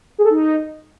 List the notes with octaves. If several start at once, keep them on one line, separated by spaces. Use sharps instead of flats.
G#4
A4
D#4